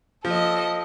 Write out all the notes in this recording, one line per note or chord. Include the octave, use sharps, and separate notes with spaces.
F3 A4 D#5